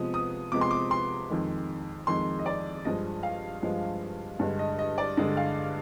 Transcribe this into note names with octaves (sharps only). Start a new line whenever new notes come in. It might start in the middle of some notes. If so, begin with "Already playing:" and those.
Already playing: C3 F3 G#3 B3 D#6
D#6
C3 F3 G#3 B3 D6
C6
D6
C6
F2 D#3 G#3
F2 D#3 G#3 C6
D#5
D5
G2 F3 G#3 D#5
F5
G2 F3 G#3
G2 D3 G#3
D#5
D#5
D5
G2 D3 G#3 D#5
F5